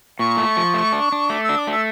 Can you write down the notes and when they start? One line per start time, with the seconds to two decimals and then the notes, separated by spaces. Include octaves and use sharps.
0.19 A#2 C#6
0.37 A3
0.57 F3
0.74 A3
0.93 D4
1.12 D4
1.30 A3 D6
1.44 E6
1.49 D4
1.59 D6
1.67 A3 E6